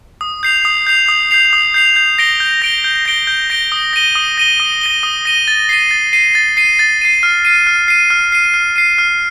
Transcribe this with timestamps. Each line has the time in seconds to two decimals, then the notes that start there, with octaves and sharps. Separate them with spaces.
0.21 D#6
0.43 G6 C7 F7
0.65 D#6
0.87 G6 C7 F7
1.08 D#6
1.31 G6 C7 F7
1.53 D#6
1.74 G6 C7 F7
1.96 G6
2.18 A#6 D7 G7
2.40 G6
2.62 A#6 D7 G7
2.84 G6
3.06 A#6 D7 G7
3.27 G6
3.50 A#6 D7 G7
3.72 D#6
3.93 A#6 D#7 G7
4.15 D#6
4.38 A#6 D#7 G7
4.60 D#6
4.81 A#6 D#7 G7
5.03 D#6
5.25 A#6 D#7 G7
5.48 A6
5.69 C7 D#7
5.91 A6
6.13 C7 D#7
6.35 A6
6.57 C7 D#7
6.79 A6
7.01 C7 D#7
7.23 F6
7.45 C7 D#7
7.67 F6
7.88 C7 D#7
8.10 F6
8.32 C7 D#7
8.54 F6
8.76 C7 D#7
8.98 F6